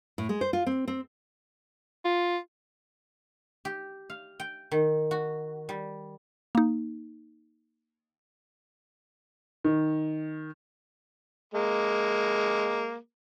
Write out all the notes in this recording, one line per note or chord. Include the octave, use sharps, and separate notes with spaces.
A2
G#3
C5
F4
C4
C4
F4
G4
F5
G5
D#3
F#4
G3
A#3 D#4
D#3
G#3 A#3